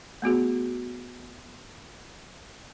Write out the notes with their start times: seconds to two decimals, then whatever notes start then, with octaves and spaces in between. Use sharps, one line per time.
0.22 A3 B3 F#4 G#4